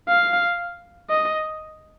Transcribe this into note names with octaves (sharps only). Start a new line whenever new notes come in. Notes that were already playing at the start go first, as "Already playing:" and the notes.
F5
D#5